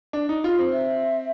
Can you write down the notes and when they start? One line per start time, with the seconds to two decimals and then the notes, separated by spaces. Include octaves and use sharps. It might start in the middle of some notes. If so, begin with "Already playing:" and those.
0.13 D4
0.29 D#4
0.44 F4
0.59 C4
0.73 E5